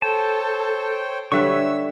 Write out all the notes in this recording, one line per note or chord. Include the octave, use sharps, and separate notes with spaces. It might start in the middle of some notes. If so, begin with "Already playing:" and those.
A4 C5 C#5 G5 A5
D3 G3 B4 C#5 E5 C#6 E6